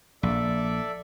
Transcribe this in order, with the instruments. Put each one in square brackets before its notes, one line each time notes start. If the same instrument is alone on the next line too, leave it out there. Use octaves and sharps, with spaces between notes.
[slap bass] A#1 [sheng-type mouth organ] A4 D5 E5